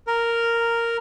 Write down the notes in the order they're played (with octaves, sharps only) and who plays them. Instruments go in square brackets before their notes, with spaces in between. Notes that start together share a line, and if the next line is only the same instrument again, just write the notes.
[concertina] A#4